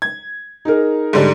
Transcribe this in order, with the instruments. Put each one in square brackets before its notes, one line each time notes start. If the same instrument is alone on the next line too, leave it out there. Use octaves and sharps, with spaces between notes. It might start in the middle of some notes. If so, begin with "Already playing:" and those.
[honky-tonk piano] G#6
[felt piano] D#4 G#4 A#4
[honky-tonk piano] G#2 D3 G3